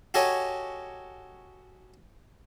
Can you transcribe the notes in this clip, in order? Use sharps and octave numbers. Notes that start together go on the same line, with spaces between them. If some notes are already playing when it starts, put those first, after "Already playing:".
F#4 G4 A4 C#5 D#5 G#5